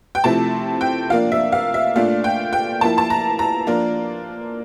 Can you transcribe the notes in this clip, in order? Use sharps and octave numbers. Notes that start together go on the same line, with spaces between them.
G5
C3 F3 A3 C4 E4 A5
G5
F3 A#3 D4 F5
E5
F5
E5
A#2 A3 D4 F4 F5
G5
G5
F3 A#3 E4 A5
A5
A#5
A#5
F3 A#3 D4 F4